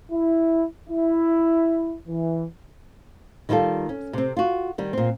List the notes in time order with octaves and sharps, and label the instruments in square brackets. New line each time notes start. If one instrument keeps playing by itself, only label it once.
[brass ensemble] E4
E4
E3
[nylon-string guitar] D#3 G3 E4 F4 A4
C#4
C3 C4
F4 F#4
D#3 G3
A#2 C4